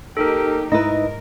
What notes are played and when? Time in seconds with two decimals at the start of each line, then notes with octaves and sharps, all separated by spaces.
0.17 A#3 D#4 G4 A4 A#4
0.72 G#2 D#4 E4 A#4 B4 D#5